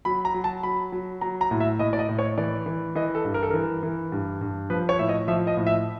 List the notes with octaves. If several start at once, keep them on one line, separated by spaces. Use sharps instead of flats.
F#3 B5
A#5
F#3
A5
F#3 B5
F#3
F#3 A#5
A#5
A2
E5
A2 D#5
D5
D#5
A2
C#5
E3 D5
E3
E3 D#5
A4
G2
A#4
A4
E3 A#4
E3
G2
G2
F3 B4
C#5
A2 E5
D#5
F3 E5
D#5
A2
E5